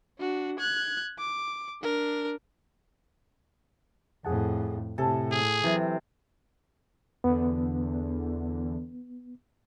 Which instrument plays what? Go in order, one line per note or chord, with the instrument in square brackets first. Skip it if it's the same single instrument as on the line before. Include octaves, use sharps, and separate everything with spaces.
[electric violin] D4 F#4
F#6 G#6
D6
D4 A#4
[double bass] F2 A2 [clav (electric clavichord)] G#4 F#5 A5
[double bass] A2 [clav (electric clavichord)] C3 G#5 [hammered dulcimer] A4
[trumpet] G#4
[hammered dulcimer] C3 [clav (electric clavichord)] E3 [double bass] F#3
[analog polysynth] E2 D3 [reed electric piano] B3